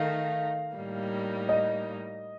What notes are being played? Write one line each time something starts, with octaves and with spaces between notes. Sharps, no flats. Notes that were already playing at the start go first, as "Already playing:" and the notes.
Already playing: D#3 A3 D#4 F5
A2 G3 A#3 D#4
D#5